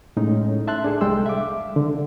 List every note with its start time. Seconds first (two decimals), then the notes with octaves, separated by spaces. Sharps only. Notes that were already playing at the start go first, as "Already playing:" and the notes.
0.17 A2 G#3 C#4 D#4
0.68 E5 A5 C6 F#6
0.84 D4 G#4 A4
1.01 C2 G3 G#3 G5 C6 E6
1.26 E5 F5 D6
1.76 D3